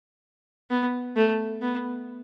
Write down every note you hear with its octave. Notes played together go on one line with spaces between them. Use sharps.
B3
A3
B3